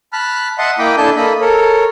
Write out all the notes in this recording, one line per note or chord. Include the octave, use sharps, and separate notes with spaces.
A5 B5 F6 F#6
D#5 E5 F#5 A5 C6
A#3 E4 D#5 G5 B5 D6
D4 E4 A4 G#5 A5 G6
A#3 A4 D#5 B5
A4 A#4 C#5